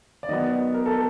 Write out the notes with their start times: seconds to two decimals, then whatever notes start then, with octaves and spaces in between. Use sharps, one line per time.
0.23 D5
0.29 D#3 F#3 B3 D#5
0.74 A#4
0.86 A4